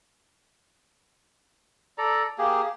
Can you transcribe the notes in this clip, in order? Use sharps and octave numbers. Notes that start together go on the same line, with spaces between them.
A4 D5 A#5
A#3 G4 G#4